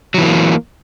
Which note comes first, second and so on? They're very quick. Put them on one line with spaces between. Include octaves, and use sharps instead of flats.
F#3 E3 B3 A#3